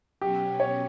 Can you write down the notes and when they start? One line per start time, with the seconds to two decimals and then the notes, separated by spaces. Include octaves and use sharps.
0.21 B2 F#3 C#4 G4
0.60 C#5